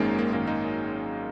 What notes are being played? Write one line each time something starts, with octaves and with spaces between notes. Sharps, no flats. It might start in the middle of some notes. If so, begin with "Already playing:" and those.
Already playing: G#1 F#2 D#3 G#3 A#3 C#4 D#4
A#3
G#1 F#2 D#3 A#3
A#3 D#4